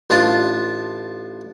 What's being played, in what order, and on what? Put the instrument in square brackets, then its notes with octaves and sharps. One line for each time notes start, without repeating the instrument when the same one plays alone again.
[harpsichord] A1 D4 F4 A5